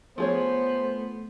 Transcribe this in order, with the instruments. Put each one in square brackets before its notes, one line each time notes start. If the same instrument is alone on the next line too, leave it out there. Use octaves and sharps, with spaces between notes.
[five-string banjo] F3 G#4 C#5 [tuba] A3 [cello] B3 [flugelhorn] C5